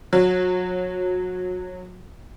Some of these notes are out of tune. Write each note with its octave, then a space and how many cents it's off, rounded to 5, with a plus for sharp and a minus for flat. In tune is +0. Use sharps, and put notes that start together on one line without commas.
F#3 -25